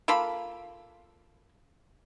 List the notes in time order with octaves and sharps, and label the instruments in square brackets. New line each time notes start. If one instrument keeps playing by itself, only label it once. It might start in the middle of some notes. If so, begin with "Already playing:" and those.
[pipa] A#3 F4 A4 B5